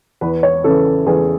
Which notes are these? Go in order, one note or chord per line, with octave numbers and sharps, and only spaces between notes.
E2 B4
C#5
C#3 E3 A4
E2 G#4